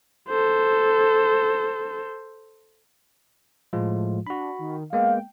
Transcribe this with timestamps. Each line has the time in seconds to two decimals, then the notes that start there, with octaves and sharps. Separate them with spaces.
0.30 A4 C5
3.73 A2 F3 G#3 F4
4.27 D4 F#4 B5
4.59 D#3
4.93 G#3 A#3 B3 F5 G5